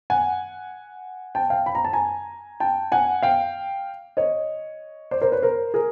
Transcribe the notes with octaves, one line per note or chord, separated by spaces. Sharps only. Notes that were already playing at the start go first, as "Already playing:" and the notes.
F#5 G#5
G5 A5
F5 G5
B5
A#5
A5
G#5 A#5
G5 A5
F#5 G#5
F5 G5
C#5 D#5
C5 D5
A#4 C5
B4 C#5
A#4 C5
G#4 A#4